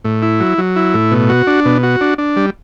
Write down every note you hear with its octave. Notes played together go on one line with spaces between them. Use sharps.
A2
E4
F#3
F#3
E4
A2
B2
F#4
D4
B2
F#4
D4
D4
G3